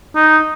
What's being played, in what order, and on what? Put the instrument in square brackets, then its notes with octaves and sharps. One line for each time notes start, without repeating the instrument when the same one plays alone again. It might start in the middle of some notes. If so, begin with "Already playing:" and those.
[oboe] D#4